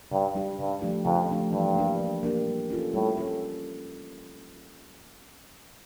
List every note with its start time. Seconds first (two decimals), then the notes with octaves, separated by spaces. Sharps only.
0.11 G2 C#3
0.35 G3 D4 G4
0.59 G2 C#3
0.82 F3 A3 D4 G4
1.05 F2 C#3
1.29 F3 A3 D4 G4
1.52 G2 E3
1.75 A#3 D4 G4
2.00 E3
2.23 A#3 D4 G4
2.47 G3
2.70 C#4 F4 A4
2.93 A2 G3
3.17 C#4 F4 A4